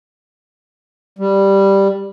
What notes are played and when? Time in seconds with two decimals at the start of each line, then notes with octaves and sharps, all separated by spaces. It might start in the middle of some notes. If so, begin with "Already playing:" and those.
1.19 G3